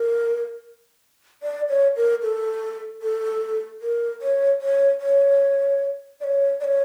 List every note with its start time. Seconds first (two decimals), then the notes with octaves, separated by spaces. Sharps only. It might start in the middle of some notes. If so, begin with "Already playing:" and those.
Already playing: A#4
1.43 D5
1.69 C#5
1.96 A#4
2.22 A4
3.02 A4
3.82 A#4
4.22 C#5
4.61 C#5
5.01 C#5
6.21 D5
6.24 C#5
6.61 D5
6.64 C#5